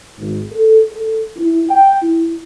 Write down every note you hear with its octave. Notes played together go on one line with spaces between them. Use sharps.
G#1
A4
A4
E4
G5
E4